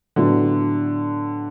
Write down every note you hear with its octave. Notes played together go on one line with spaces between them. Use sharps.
A2 D3 F#3 B3